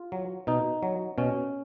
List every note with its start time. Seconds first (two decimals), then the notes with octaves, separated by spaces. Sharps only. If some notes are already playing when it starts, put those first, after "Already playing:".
Already playing: F4
0.12 F#3
0.47 B2 D#4
0.83 F#3
1.18 B2 C#4